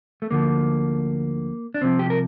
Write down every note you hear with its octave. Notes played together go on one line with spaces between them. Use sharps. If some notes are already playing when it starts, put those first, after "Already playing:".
A3
D2 D3 F3 A#3
D4
C2 C3 F3 C4
G4
A#4